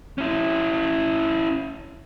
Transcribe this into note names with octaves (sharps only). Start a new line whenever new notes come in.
C#4 E4